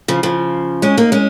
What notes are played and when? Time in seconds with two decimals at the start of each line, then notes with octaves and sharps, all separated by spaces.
0.08 C#3 F3
0.23 C#3 F3
0.82 G#3 C#4
0.97 A#3 D#4
1.12 G#3 C#4